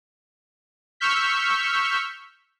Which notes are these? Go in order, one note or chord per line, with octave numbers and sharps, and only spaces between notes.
C#6 E6 F6 G6 B6